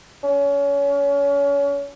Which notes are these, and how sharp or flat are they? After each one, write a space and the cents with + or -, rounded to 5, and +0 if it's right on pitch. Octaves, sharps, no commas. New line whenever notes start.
C#4 +30